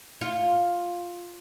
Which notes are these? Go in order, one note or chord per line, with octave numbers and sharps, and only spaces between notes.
F4